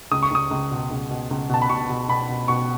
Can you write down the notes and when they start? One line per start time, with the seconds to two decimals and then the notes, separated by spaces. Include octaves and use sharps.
0.11 C#2 D#6
0.23 C#6
0.31 C#2 D#6
0.51 C#2
0.71 B2
0.91 C#2
1.11 B2
1.31 C#2
1.49 B2 A5
1.62 B5
1.69 B2 C#6
1.89 B2
2.08 B2 B5
2.29 B2
2.48 B2 C#6